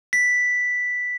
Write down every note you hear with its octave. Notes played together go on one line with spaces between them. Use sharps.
B6